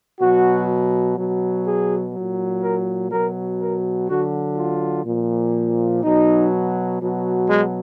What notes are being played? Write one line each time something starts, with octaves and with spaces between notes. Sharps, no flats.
B2 F#3 F#4
B2 F#3
G#4
A#2 F#3
A#4
B2 F#3 A#4
A#4
D3 F#3 F#4
F4
A#2 F3
B2 F#3 D#4
B2 F#3
G#3